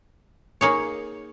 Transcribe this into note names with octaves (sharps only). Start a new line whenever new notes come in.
A#3 D#4 G#4 C#5